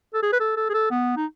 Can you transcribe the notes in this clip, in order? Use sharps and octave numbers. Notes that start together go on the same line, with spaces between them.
A4
G#4
B4
A4
A4
G#4
A4
B3
D#4